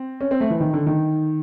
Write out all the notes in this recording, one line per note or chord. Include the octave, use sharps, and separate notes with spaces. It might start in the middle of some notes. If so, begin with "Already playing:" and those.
Already playing: C4
C#4
C4
A3
E3
D#3
D3
D#3